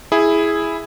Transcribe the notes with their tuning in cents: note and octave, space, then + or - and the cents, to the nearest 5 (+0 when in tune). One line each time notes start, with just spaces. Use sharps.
E4 +0 G#4 +0